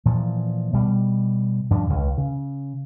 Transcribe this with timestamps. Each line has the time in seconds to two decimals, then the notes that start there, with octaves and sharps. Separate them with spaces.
0.05 A#2 E3 F3
0.73 B2 G3
1.70 G2 F3 D4
1.89 C#2
2.18 C#3